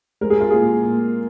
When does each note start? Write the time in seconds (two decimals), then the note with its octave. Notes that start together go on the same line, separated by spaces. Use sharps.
0.21 G#3 A#4
0.30 G#4
0.40 F4
0.50 A#2 G#4
0.83 A#2